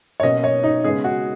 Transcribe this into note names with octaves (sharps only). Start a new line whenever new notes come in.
C#5
B2 A#3 C#4 D#5
C#5
D#4
C#3 G#3 B3 G#4
F#4